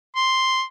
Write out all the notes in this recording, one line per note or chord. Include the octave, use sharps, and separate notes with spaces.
C6